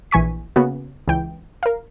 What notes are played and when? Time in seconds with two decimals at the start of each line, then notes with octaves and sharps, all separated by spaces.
0.11 A#1 E3 G#5 C#6 B6
0.56 C#3 A#3 B3 F#4
1.08 C#2 E3 G5
1.63 A#4 F5